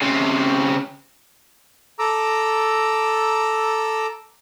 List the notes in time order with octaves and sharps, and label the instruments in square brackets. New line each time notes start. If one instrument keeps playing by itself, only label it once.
[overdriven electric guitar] C#3 C4
[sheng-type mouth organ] A4 A#5 D6 E6